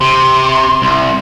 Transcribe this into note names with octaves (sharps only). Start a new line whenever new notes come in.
C3 C6
C2